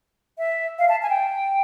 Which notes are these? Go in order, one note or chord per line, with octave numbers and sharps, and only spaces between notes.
E5
F5
A5
G#5
G5